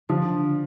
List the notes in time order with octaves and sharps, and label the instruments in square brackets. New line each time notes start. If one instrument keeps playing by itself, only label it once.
[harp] D3 [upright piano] F3